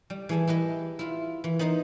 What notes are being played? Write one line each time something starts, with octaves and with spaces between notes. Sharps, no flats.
G3
E3 G#4 A5
E4 G4 B4 D#5
E4 F4
E3
B3 D#4 C5 D#5